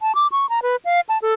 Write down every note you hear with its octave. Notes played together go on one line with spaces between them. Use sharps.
A5
D6
C#6
A#5
B4
F5
A5
A4